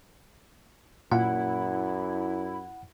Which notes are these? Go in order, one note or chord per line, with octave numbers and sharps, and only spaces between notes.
F#2 A#2 E4 F#5